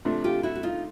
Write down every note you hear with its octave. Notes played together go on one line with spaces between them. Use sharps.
C3 F3 A3 D4
F4 G4
E4 F#4
F#4
D#4 F4